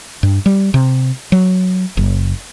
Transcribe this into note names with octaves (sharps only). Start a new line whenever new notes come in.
G2
G3
C3
F#3
F#1